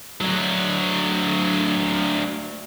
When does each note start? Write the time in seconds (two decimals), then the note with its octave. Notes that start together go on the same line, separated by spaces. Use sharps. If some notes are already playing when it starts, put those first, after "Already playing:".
0.21 D2 F#3